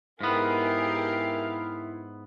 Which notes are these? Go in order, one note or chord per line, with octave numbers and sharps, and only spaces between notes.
G#2 B3 E4 G4 G#4 A#4 F5